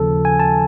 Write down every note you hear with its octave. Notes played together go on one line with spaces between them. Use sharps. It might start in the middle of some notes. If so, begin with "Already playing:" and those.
Already playing: D#2 C#3 F3 A4
G#5
A5